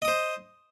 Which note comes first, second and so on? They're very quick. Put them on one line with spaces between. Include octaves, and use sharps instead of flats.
D#5 D#6 C5